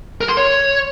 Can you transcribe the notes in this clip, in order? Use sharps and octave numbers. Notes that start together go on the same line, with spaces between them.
A#4
C6
C#5